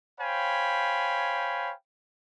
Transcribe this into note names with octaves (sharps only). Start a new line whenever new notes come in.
C5 C#5 F5 G5 G#5 B5